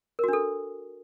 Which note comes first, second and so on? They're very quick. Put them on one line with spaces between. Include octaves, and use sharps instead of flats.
A#4 F#4 D4 A4